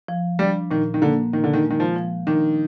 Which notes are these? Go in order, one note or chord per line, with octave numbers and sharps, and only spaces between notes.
F3
G3 D4
A#2 D#3
D#3
D3 A#3
A#2 D#3
D3
D#3
G#3
D#3
F3
F3
D#3 D4